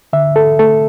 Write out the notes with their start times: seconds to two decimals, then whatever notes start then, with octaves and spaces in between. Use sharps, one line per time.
0.13 D3 E5
0.36 A4
0.59 A3 A4